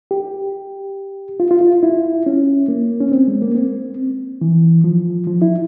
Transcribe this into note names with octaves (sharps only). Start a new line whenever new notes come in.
G4
F4
F4
F4
E4
C#4
A#3
C#4
C4
G#3
A#3
C4
E3
F3
F3
E4